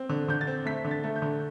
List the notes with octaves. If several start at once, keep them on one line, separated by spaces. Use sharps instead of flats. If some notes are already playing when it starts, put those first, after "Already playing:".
Already playing: C4
D3
D3 G6
A6
C4
A3 B6
D3
A6
A3
G6
D3